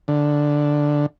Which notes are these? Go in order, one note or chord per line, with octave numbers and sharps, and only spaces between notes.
D3